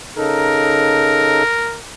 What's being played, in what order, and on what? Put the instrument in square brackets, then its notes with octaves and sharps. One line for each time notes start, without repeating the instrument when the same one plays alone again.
[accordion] C#3 D#4 A4 [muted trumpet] A#4